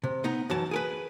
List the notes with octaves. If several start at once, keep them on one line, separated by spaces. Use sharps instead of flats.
C3
B3 D#4 A#5
F#2 E3 A5
G#4 A#4 B4